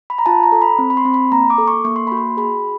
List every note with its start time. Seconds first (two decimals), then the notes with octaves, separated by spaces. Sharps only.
0.10 B5
0.18 A#5
0.26 F4 A5
0.43 A#5
0.52 A4
0.61 B5
0.79 C4
0.90 B5
0.97 C6
1.05 C4
1.14 B5
1.32 A#3 A#5
1.50 D6
1.58 A4
1.68 C#6
1.84 A#3 C#6
1.96 C6
2.07 F#4 B5
2.17 C6
2.37 G#4 B5